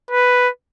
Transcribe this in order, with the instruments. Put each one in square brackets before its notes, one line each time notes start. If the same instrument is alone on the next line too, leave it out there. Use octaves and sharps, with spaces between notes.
[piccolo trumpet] B4